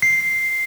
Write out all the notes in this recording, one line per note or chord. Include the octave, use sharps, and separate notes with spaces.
C7